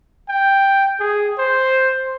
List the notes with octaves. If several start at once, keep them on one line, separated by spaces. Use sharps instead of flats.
G5
G#4
C5